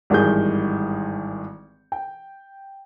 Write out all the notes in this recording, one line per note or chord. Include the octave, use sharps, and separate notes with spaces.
G#1 G2 D#3 E3 G#4 G6
G5